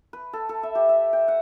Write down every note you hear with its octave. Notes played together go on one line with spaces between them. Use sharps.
B4
A4
A4
E5
G4
E5
G5
F#5